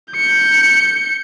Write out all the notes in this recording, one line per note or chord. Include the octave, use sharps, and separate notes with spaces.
G6 C#7